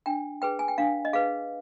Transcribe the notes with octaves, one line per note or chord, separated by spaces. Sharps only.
D4 G5
G#4 B4 G5
G#5
G5
D4 F5
D#5
G#4 B4 F5